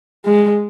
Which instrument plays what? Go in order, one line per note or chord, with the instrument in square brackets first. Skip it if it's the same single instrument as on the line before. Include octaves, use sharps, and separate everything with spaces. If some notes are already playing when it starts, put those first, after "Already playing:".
[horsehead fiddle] G#3